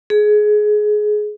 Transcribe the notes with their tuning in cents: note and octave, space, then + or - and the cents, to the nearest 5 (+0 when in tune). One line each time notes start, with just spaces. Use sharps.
G#4 +20